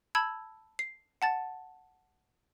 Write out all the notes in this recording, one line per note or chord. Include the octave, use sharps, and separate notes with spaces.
A5 B5 E6 G#6
C7
F#5 A5 A6